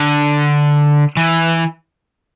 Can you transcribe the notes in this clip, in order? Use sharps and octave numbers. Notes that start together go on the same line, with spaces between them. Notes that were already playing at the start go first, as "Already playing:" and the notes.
Already playing: D3
E3